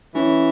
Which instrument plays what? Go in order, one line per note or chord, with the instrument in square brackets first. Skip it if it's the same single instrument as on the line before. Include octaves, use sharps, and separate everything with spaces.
[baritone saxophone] E3 [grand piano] C#4